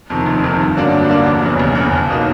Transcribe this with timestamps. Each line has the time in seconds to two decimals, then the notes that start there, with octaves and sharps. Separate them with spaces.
0.10 F2 C3 D#3
0.26 F1
0.44 F2 C3 D#3
0.60 G2
0.77 D3 F#3 A#3 D4
0.93 G2
1.09 D3 F#3 A#3 D4
1.26 F1
1.42 E2 C#3
1.59 F1
1.75 E2 C#3
1.92 B1
2.09 B2 F#3 A#3 D#4